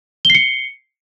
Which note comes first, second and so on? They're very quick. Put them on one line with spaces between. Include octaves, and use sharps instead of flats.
G7 C7 C#7